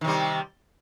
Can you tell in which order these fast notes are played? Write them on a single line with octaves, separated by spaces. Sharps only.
D#3 C3 G3